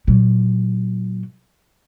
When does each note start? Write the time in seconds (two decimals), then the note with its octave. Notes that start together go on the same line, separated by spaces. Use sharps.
0.07 A#2 F#3